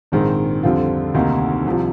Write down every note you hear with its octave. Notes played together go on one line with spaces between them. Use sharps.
A#1 G#2 D#3 G#3 C4
F2 D3 G3 C4 F4
D2 C3 D#3 A#3 D#4
C2 C3 F3